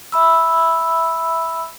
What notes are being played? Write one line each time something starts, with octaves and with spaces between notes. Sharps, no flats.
E5 B5 E6